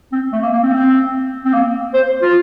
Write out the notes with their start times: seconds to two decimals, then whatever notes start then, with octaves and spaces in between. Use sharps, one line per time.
0.12 C4
0.33 A3
0.43 A#3
0.53 A#3
0.63 C4
0.73 C4
1.45 C4
1.53 A#3
1.94 C5
2.22 F4